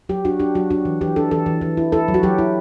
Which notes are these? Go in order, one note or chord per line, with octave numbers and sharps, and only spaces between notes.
F#3 G4
D4 F#4
D4 G4
F#3 F#4
D4 F#4
E3
E3 G4
D4 A4
E3 A4
E3
E3
E4
E4 A4
F#3
F#4
F#3 G4
E4